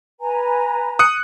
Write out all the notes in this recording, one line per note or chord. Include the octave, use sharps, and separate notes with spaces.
B4 G#5 A#5
D#6 F#6 C#7